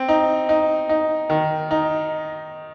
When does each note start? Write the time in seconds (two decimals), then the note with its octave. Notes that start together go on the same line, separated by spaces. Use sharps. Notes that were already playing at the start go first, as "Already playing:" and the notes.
Already playing: C4
0.08 D#4
0.49 D#4
0.89 D#4
1.30 D#3
1.71 D#4